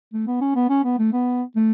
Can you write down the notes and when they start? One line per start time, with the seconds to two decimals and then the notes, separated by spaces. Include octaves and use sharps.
0.13 A3
0.27 B3
0.41 C#4
0.55 B3
0.69 C#4
0.84 B3
0.98 A3
1.13 B3
1.56 A3